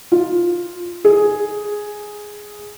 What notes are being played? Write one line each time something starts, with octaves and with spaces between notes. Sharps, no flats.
F4
G#4